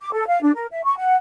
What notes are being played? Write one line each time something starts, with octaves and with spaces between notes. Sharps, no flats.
D6
A4
F5
D4
A#4
E5
C#6
F#5